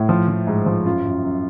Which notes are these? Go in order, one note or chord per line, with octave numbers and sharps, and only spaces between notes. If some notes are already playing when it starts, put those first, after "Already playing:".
Already playing: A2
F3
F3
G#2
F3
F#2 F4
F#2
F#2